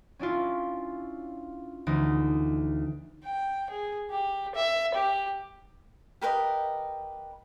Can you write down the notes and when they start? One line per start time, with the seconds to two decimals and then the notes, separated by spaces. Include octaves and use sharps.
0.19 C#4 D4 E4 F4
1.87 D2 E3 D#4
3.25 G5
3.70 G#4
4.10 G4
4.55 E5
4.94 G4
6.21 G4 A#4 B4 D#5